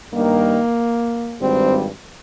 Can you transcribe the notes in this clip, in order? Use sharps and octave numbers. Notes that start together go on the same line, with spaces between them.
G2 D#3 G3 A#3
G#1 G2 G3 C4